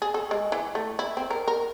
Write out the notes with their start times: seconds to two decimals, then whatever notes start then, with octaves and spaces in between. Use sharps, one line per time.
0.02 G#4
0.14 A4
0.31 G#3
0.52 E3
0.75 A3
0.99 E4
1.17 C4
1.30 A#4
1.47 A#4